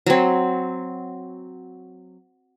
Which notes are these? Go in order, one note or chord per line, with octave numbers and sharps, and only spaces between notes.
F#3 C4